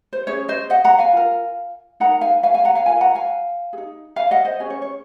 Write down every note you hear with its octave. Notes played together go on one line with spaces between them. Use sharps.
C5
C#4 G#4 C#5
C5 D#5
D#5 F#5
F#5 A#5
F5 G#5
F4 A#4
D#4 A#4 F#5 A#5
F5 G#5
F5 G#5
F5 G#5
F#5 A#5
F5 G#5
F4 A#4 F5 G#5
F#5 A#5
F5 G#5
G#4
D#4
F5 G#5
D#5 F#5
C5 D#5
C#4 G#4
C#5
C#5